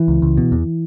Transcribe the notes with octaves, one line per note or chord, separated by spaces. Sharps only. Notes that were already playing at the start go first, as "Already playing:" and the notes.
Already playing: E3
C#2
C#2
B2
E2